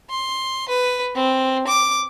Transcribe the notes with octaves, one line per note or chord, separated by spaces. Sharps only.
C6
B4
C4
D6